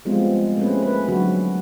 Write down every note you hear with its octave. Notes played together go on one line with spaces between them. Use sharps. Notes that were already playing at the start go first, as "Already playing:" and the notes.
F3 G3 G#3 B3 C4 F4
A3 A#3 C4 C#4 G#4 B4
B4
D3 F#3 F#4